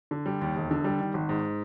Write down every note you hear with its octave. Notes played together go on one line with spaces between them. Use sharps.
D3
G3
D#2
E1
D3
G3
D#3
G#1
G#2